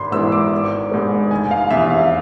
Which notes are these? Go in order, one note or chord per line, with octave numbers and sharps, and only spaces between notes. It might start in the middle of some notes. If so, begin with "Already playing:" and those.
Already playing: G#1 B5 C6
G#2 E3 B3 E6
D6
G#1
G#2 G#3 B3
F1 G#5
F5
E2 C3 E5
F5